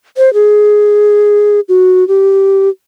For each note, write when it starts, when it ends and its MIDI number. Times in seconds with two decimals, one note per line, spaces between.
0.17 0.33 72
0.34 1.60 68
1.69 2.07 66
2.08 2.69 67